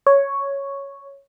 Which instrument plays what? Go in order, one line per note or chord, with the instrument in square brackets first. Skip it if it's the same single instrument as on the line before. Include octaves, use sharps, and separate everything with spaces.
[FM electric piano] C#5